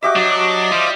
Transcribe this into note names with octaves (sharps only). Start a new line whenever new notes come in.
F#4 G4 D#5 E5 D6
F#3 D4
G3 F4 C5